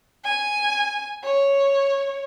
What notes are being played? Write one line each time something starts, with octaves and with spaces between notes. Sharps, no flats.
G#5
C#5